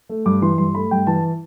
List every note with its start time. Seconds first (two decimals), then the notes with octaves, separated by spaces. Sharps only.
0.09 A3
0.26 G2 D6
0.42 E3 C6
0.58 G2 C6
0.75 A3 B5
0.91 G2 G5
1.07 E3 A5